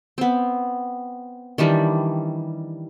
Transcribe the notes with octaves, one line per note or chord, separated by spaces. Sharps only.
B3 C4
D#3 E3 G3 D4